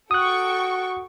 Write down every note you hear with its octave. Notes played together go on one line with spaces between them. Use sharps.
F#4 A4 G5 C#6 D#6 F#6